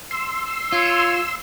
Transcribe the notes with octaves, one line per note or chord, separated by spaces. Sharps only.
C6 E6
F4 C#5